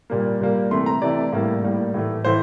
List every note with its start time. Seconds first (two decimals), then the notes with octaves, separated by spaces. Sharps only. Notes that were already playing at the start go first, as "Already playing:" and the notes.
0.10 A#2 G3 A#3
0.41 A#2 G3 A#3
0.71 C3 E3 A3 C6
0.86 A#5
1.02 C3 E3 A3 D5
1.32 A2 G3 A#3
1.63 A2 G3 A#3
1.94 A2 E3 A3
2.25 A2 E3 A3 C5